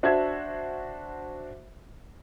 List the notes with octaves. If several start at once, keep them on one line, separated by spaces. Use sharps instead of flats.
D4 F#4 C5 E5 G#6